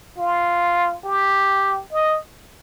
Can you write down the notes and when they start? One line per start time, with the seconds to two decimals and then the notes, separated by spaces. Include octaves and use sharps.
0.18 F4
1.04 G4
1.92 D#5